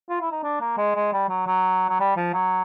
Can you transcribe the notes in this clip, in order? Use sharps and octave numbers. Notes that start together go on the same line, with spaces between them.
F4
E4
D#4
D4
A#3
G#3
G#3
G3
F#3
F#3
F#3
G3
F3
F#3